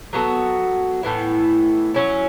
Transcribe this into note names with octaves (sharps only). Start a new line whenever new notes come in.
F#3 B3 F#4 A4
A2 E3 B3 E4
F#3 C#4 E4